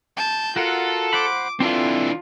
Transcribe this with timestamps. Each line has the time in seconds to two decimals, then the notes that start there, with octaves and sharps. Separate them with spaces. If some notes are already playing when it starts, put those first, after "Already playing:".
0.17 A5 G6
0.56 F4 F#4 A4 A#4 F#5
1.13 C5 F#5 B5 D6
1.60 E3 C4 D4 E4 F4 A4